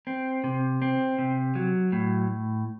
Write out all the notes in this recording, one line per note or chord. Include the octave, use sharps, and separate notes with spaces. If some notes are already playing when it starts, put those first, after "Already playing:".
C4
C3
C4
C3
F#3
A2